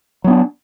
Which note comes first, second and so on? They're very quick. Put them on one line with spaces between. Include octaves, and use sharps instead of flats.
F#3 B3 D4